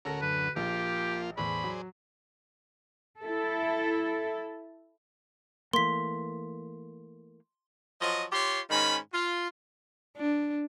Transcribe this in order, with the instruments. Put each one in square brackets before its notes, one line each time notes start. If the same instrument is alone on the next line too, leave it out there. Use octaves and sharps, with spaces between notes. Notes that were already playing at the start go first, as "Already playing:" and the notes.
[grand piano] D1 A4 A#6 [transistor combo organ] C#4 F#4 A#4
[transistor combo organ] F#2 D3 [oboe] B4
[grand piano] A#1 [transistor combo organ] F3 A#3 F4 [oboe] G4
[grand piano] E2 A2 [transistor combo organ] G#4 C5 D5 [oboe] B5
[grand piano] F#3
[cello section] E4 A4
[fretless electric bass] E3 A3 A#3 [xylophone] C6 B6
[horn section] F3 F#3 D#5
F4 G4 C#5 C6
G#2 D#3 C#4 B5
F4
[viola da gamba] D4